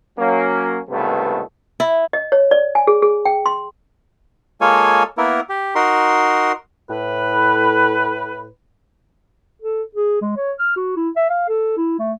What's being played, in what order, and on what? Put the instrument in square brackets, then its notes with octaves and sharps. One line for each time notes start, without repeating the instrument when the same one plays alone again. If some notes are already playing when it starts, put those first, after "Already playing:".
[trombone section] F#3 A#3 C#4
C#2 G2 C3 D#3 A3 B3
[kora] E4
[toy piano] D#5
C#5
D5
G#5
G#4
G#4
G5
C6
[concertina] G#3 A#3 F4 A4 C#5 G#5
A#3 B3 E4 A#4
G4
D#4 F#4 A#4 C6
[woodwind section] A2 B4
[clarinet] A4
G#4
G#3
C#5
F6
F#4
E4
E5
F5
A4
E4
A3